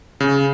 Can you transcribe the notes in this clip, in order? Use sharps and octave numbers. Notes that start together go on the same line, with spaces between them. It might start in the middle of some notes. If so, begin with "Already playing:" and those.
C#3